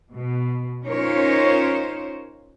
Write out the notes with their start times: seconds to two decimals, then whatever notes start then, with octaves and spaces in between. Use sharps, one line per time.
0.13 B2
0.85 C#4 D#4 F4 A#4 C5 C#5